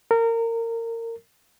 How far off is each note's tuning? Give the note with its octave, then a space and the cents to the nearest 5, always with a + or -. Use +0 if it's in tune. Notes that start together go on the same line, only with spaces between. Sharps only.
A#4 -25